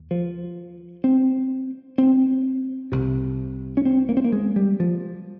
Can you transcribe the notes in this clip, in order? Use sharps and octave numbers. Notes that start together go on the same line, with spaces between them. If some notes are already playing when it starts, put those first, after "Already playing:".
Already playing: D#2
F3
C4
C4
C2 C3
C#4
C4
A#3
C4
A#3
G#3
G3
F3